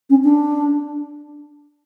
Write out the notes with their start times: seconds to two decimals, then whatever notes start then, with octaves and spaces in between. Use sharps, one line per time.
0.10 C#4
0.24 D4